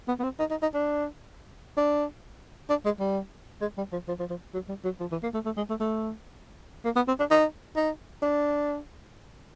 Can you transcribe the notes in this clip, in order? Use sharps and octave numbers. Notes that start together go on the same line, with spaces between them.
B3
B3
C4
D#4
D#4
D#4
D4
D4
D4
G#3
G3
G#3
G3
F3
F3
F3
F3
F#3
G3
F#3
F3
E3
A#3
A3
A3
G#3
A3
A3
A#3
B3
C4
D4
D#4
D#4
D4